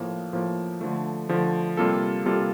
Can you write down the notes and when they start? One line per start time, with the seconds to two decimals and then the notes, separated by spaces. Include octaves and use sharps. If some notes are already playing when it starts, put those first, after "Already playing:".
Already playing: A2 F3 A#3
0.33 A2 F3 A#3
0.81 D3 F3 A3
1.29 D3 F3 A3
1.77 C3 G3 A#3 F4 A4
2.26 C3 G3 A#3 F4 A4